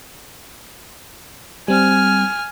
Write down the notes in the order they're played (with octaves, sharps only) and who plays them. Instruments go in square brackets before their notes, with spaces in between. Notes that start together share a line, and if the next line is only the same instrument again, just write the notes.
[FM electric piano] G3 C4 [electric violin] G#5 F6